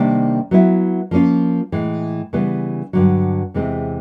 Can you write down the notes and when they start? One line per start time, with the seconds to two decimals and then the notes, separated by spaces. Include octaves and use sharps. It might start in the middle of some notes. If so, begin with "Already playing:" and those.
Already playing: C3 D#3 G3 A#3 D4
0.51 F#3 B3 E4
1.11 F3 A#3 C#4 F4
1.72 A2 E3 G#3
2.33 C#3 E3 G3 B3
2.93 G2 D3 F#3
3.54 E2 C3 E3 G#3 C4